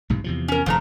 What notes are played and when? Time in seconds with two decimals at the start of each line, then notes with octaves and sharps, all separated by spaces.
0.10 B1 G#2 C3
0.24 E2 C3 F3
0.48 C#4 A#4
0.66 F1 G2 F3 A3 A#5